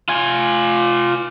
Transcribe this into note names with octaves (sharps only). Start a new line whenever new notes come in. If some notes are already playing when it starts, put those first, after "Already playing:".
F4 G#5